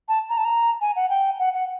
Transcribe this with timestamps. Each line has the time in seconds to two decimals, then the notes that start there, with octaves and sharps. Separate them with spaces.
0.08 A5
0.30 A#5
0.37 A5
0.45 A#5
0.81 G#5
0.96 F#5
1.10 G5
1.39 F#5
1.54 F#5